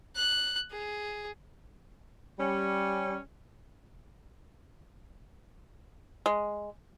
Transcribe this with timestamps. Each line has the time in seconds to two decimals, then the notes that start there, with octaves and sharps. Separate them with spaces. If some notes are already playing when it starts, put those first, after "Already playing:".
0.16 F#6
0.71 G#4
2.38 G3 C#4
6.26 G#3